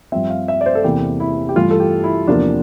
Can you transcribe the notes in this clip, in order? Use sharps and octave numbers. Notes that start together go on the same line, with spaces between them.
G2 F3 C4 E5
F5
E5
D5
C5
A4
E2 C3 E3 A#3 G4
E4
G4
G2 E3 A3 F4
A4
G4
E4
E2 C3 F3 A#3 D4